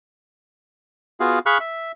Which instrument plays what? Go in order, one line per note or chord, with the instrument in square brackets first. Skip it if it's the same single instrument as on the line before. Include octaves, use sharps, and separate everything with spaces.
[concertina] B3 F4 F#4 G#4 F5
G#4 F5 B5 C#6 F6 F#6
E5